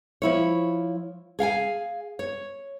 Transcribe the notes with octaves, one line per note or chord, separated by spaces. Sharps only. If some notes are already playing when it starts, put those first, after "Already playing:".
F3 E4 C#5
G#4 F5 G5 G#5
C#5